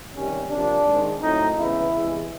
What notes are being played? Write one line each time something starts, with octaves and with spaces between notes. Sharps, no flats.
C3 D#3 G3 C#4
C3 F3 A#3 D4
G#2 D#3 G#3 C4
A2 F#3 A3 C4 D#4
C#3 E3 G#3 B3 E4
E2 C3 E3 G#3